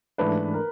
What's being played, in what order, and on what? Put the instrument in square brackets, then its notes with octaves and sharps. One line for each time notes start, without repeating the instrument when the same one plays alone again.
[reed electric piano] G#2 E3 A3 D4 [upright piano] B4
[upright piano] A#4